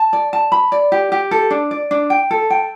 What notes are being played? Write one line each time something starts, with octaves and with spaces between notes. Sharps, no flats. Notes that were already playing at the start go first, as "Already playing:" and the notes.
Already playing: A5
D5
A5
B5
D5
G4
G4
A4
D4
D5
D4
G5
A4
G5